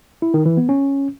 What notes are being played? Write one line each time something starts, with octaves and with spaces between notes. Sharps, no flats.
E4
D#3
E3
B3
C#4